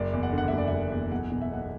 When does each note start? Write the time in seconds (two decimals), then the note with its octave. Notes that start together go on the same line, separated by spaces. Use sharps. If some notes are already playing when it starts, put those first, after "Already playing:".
Already playing: F#1 D5
0.13 E2
0.23 F#5
0.33 D3
0.38 F#5
0.48 F#1 E5
0.58 D5
0.67 E5
0.72 F#1
0.92 E2
1.12 B1 F#5
1.32 B2
1.41 E5
1.51 B1 F#5